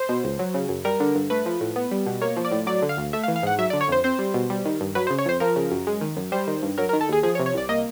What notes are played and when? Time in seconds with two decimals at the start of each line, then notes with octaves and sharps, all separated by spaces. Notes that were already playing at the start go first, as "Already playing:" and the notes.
Already playing: C5
0.09 B2
0.24 C#2
0.39 F#3
0.54 C#3
0.69 F#2
0.85 G3 A#4
1.00 D3
1.15 G2
1.30 A3 B4
1.46 F3
1.61 A2
1.76 B3
1.91 G3
2.07 B2
2.21 A#3 C#5
2.37 F3
2.45 D5
2.52 A2
2.67 F#3 D5
2.82 D3
2.89 F5
2.97 D2
3.13 A3 E5
3.23 F5
3.28 E3
3.36 F5
3.43 G#2 F#5
3.58 F#3 E5
3.70 D5
3.73 D3
3.81 C#5
3.88 F2 C5
4.04 C4 C5
4.19 G3
4.34 B2
4.50 G3
4.65 D#3
4.81 G2
4.95 F#3 B4
5.07 C5
5.10 C#3
5.18 C#5
5.26 F2 C5
5.40 F3 A#4
5.56 C#3
5.71 F#2
5.87 G#3
6.01 D#3
6.16 F#2
6.32 G3 C5
6.47 D#3
6.63 G2
6.78 F#3 A#4
6.89 A#4
6.93 D#3
7.01 A4
7.09 D#2 G#4
7.23 F3 G#4
7.35 C#5
7.39 C3
7.46 C#5
7.54 C2 D5
7.69 A#3 D#5